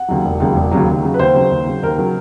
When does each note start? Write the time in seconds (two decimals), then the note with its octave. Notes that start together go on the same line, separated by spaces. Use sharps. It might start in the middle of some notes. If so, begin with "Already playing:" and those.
Already playing: F#5
0.08 D#2 C#3 F#3
0.25 E1
0.40 D#2 C#3 F#3
0.56 E1
0.71 D#2 C#3 F#3
0.88 D#2
1.03 C#3 F#3
1.14 B4
1.19 D#2 C5
1.35 C#3 F#3
1.51 D#2
1.67 C#3 F#3
1.83 D#2 A#4
1.98 C#3 F#3